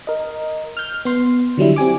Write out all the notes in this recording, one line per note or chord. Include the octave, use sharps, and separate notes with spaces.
A#4 D#5
F6 G6
B3 C6
D3 F#3 G3 E4
C4 G4 G#5 D6